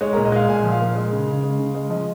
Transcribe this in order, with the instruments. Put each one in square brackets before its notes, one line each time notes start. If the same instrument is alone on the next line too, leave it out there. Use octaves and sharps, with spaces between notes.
[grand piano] G#3 C#5
A#2 A#4
D#5
G#3 F5
A#2 G#5
F3
F5
A#2
G#3
C#3
C#3
G#3
C#3
G#3
F3 D#5